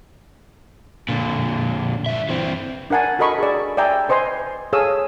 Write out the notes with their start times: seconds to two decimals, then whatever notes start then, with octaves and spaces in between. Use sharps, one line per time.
1.09 A#2 D3
2.06 G2 E5
2.29 E3 C4
2.90 D4 A#4 F#5 G#5 A5
3.19 F#4 A4 A#4 D#5 B5 C#6
3.38 G#4 D5
3.77 D5 E5 G5 G#5 A#5
4.09 B4 C5 D#5 G#5 C6
4.73 G#4 A4 C#5 F5 D#6 E6